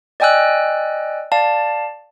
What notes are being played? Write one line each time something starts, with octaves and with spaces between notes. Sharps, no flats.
D5 D#5 G5 G#5 E6 F#6
D5 F5 A5